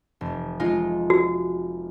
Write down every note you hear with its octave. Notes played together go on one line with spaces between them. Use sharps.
F1
G#3 D#4 F4
F#4